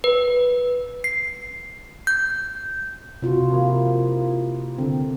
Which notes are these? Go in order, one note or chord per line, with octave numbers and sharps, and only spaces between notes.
B4
C7
G6
C3 F4 F#4
F3 A#3 E4
D3 C4